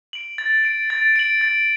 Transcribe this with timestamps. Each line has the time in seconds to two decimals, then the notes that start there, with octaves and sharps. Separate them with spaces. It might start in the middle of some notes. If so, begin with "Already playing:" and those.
0.13 D7 F#7
0.38 A6
0.64 D7 F#7
0.90 A6
1.16 D7 F#7
1.41 A6